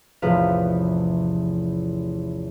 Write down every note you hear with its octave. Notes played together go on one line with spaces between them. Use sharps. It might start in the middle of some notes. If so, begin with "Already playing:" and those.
A1 E2 C3 F3 B4 F5